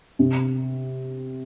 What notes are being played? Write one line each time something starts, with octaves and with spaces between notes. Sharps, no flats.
C3